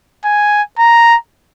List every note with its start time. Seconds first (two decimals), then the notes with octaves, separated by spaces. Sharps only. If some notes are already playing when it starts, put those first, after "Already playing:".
0.25 G#5
0.79 A#5